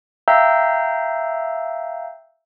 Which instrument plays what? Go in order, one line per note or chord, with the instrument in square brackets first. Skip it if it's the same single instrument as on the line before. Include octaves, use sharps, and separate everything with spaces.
[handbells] E5 F5 G5 A#5 E6 G6